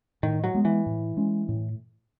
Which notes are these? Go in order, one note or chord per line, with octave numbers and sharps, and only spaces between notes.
A2 D#3
F#3
G#3 B3
E3
A2
G#3 C#4
A2